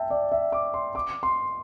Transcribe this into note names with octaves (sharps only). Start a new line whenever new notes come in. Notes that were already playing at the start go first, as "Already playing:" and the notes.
Already playing: E5 G5 A5
D5
E5
D6
C6
D6
C6